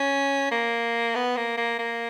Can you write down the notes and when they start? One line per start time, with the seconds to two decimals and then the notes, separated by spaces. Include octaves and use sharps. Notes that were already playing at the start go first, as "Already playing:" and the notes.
Already playing: C#4
0.51 A#3
1.15 B3
1.37 A#3
1.57 A#3
1.79 A#3